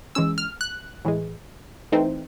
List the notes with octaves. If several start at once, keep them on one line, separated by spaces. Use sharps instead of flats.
E3 G#3 C#4 E6
F6
F#6
A2 E3 G#3
E3 A3 C4 D#4